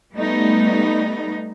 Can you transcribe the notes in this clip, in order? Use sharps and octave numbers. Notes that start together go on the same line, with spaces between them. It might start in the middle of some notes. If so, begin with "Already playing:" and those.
G3 A3 B3 D#4